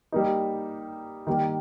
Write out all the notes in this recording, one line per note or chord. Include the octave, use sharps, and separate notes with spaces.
G3 A#3 D#4
D#3 G3 A#3